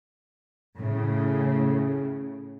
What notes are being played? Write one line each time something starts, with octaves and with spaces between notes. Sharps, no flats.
A2 C#3